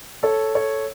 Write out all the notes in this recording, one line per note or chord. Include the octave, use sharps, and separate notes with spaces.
A4 C#5
A4 C#5